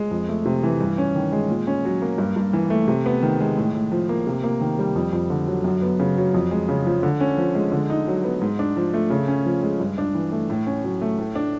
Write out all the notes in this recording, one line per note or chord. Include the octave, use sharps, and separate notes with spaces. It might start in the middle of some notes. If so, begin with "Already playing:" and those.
Already playing: G#3
F2
A3
C3
E3
G2
C#4
D#3
G#3
A#2
C#4
F#3
A#3
G2
G2
E3
A3
C3
B3
D#3
G#3
A2
A2
F3
A#3
C3
A#3
D#3
G3
F2
F2
D3
F#3
F#2
B3
C#3
F#3
F2
G#3
C#3
F3
D3
C#4
F3
G#3
D3
D#4
F#3
B3
G#2
D4
F3
A3
C#3
C#4
F3
G#3
G2
D4
E3
A3
A2
C#4
F#3
A3
A2
D4